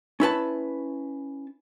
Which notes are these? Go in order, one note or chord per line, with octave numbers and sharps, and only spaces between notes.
C#4 E4 B4 A5